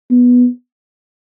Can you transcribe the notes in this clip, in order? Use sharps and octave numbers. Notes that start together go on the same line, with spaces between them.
B3